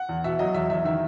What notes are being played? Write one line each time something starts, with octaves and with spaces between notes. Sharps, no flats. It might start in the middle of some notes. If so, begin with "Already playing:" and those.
Already playing: F#5
E2
B2 E5
F#3 D#5
E2 E5
E2 E5
D#3 E5